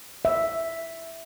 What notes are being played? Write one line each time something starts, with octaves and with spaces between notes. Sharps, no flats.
E5